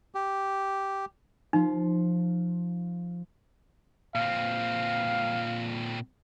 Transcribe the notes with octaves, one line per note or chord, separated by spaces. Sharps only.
G4
F3 D#4 F4
A#2 C4 F5